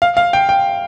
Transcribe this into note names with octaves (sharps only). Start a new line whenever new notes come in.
F5
F5
G5
G5